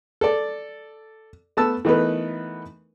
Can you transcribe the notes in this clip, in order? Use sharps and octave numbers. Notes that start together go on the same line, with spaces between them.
A4 D5
A3 B3 A5 E6
E3 A3 B3 D#4 A#4 B4